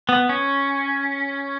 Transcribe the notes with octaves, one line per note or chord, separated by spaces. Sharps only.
B3
C#4